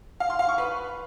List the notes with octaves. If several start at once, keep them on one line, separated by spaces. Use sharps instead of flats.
F5
C6
F5
C#6
B4